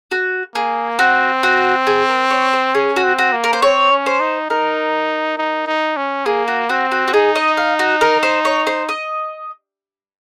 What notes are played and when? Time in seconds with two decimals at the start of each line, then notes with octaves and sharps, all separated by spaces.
0.11 F#4
0.55 A#3 G#4
0.99 C4 F#4
1.43 F#4
1.87 G#4
2.09 A#4
2.30 C#5
2.53 C5
2.75 C#4 G#4
2.96 F#4
3.04 C4
3.19 F#4
3.33 A#3
3.44 A#4
3.53 C5
3.62 C4 C#5
3.91 C#4
4.06 C5
4.21 D#4
4.50 D#4 A#4
5.38 D#4
5.67 D#4
5.97 C#4
6.26 A#3 G#4
6.48 F#4
6.69 C4 F#4
6.92 F#4
7.08 F#4
7.13 D#4 G#4
7.36 D#5
7.57 F5
7.79 F#4
8.01 A#4
8.23 C5
8.45 C#5
8.67 C5
8.89 D#5